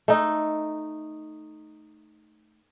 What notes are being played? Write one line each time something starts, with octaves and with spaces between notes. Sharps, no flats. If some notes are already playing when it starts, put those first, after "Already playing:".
A3 D#4